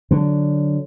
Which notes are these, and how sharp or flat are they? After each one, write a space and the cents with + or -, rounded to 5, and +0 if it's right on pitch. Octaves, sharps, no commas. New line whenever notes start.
D3 +0 F#3 +0